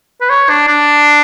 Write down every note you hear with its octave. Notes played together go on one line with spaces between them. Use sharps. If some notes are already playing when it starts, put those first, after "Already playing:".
B4
C#5
D4
D4